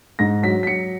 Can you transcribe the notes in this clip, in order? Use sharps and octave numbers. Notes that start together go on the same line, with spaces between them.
G#2 A#6
F#3 B6
B6
F#3 C#7